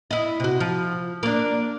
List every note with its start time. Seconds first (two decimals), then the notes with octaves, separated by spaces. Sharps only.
0.11 E4 D#5
0.40 C3 F#4
0.60 F3
1.23 A#3 D4